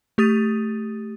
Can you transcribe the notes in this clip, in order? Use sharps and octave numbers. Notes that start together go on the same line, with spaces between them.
A3 G4 D#6 A6 D#7